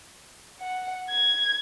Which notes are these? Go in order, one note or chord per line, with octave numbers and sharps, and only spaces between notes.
F#5
G#6